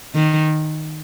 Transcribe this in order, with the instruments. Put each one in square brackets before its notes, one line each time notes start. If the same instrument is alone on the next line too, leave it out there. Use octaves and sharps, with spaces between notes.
[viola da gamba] D#3